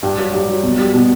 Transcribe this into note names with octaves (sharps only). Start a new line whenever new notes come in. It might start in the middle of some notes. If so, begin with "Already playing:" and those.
G2
F#3
G2
F#3
B2
G3
B2